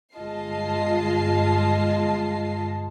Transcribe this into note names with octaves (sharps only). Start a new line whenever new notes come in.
G1 G#3 F4 D#5 A5 C7